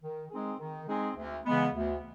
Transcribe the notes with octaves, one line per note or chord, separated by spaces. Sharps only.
D#3
G#3 C4 D#4 G#4
D#3
G#3 C4 D#4 G#4
D2
C#3 E3 G#3 B3
D2